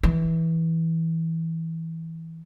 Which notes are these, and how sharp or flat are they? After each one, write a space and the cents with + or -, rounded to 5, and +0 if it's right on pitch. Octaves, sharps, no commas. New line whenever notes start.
E3 -15